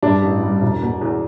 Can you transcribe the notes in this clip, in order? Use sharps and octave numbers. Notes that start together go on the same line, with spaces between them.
G2 D4
A1
G3
E1
B2
E2